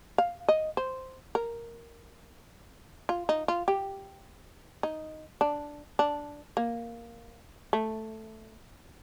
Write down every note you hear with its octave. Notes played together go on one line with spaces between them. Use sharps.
F5
D#5
C5
A#4
F4
D#4
F4
G4
D#4
D4
D4
A#3
A3